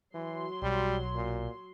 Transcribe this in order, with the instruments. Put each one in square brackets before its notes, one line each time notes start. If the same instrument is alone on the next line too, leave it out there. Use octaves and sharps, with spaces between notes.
[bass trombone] E3 [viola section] F#3 C6
[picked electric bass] B1 [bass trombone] G3
[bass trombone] A#2